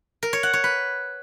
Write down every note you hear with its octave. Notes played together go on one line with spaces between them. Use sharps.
A#4
C#5
F#5
C#5
B4